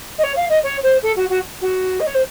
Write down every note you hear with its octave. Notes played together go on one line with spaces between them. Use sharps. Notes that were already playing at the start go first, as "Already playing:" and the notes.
D#5
C#5
F5
D#5
C#5
C5
A4
F#4
F#4
F#4
D#5
C#5
C5